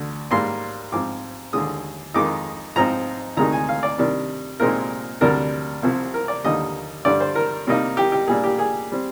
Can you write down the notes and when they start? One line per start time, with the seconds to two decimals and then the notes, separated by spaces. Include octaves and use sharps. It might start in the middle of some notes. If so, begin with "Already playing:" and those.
Already playing: D2 D3
0.31 G#2 G3 A#3 C6
0.92 G#2 F3 C4 D6
1.53 D#2 D3 G#3 D#6
2.14 F2 D#3 G#3 D#4 D6
2.76 G#2 F3 C4 D#4 A#5
3.37 D2 C3 D#3 G#3 D#4 A#5
3.52 G#5
3.69 F5
3.83 D5
3.98 C3 D#3 G3 D4
4.60 C2 A#2 G#3 C4 D#4 A#4
5.21 D2 C3 G3 D4 A#4
5.83 C2 C3 F3 C4
6.14 A#4
6.28 D5
6.44 D#2 D3 G3 A#3 D#4 D#5
7.05 G2 D3 G3 D4 D5
7.20 C5
7.35 A#4
7.67 C3 G3 A#3 D#4
7.97 G4
8.12 G4
8.27 A#2 G3 A#3 D4 G#4
8.44 G4
8.59 G#4
8.92 G3 C4